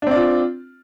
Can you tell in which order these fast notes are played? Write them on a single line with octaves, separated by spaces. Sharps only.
D4 C4 D5 F4